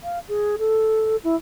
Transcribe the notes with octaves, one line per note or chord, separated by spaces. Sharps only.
F5
G#4
A4
E4